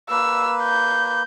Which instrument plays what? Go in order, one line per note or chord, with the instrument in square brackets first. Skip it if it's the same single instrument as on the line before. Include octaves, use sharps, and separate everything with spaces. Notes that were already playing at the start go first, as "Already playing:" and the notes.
[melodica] A#3 B4 [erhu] E6
[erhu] G6